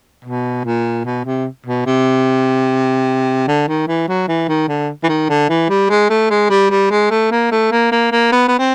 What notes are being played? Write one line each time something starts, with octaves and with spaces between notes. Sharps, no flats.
B2
A#2
B2
C3
B2
C3
D3
D#3
E3
F#3
E3
D#3
D3
E3
D#3
D3
E3
G3
G#3
A3
G#3
G3
G3
G#3
A3
A#3
A3
A#3
A#3
A#3
B3
B3
C4